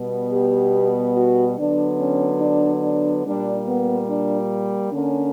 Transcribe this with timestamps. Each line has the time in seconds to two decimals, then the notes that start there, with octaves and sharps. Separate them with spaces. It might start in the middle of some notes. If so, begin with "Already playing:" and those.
Already playing: B2 G3 B3
0.33 G4
1.16 F#4
1.58 D3 F#3 B3 D4
1.99 C#4
2.41 D4
2.83 D4
3.25 A#2 G3 A#3 D4
3.68 B3
4.09 D4
4.93 D3 A#3 C#4